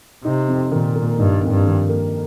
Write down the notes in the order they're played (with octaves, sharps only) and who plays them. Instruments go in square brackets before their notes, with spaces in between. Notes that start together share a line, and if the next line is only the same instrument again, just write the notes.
[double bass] C3 [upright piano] D#4
[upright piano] F2
[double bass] A#2 [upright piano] D#3
[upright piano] A#3
[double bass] G2 [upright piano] D#4
[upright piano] F2
[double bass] G2
[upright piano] D#3
A#3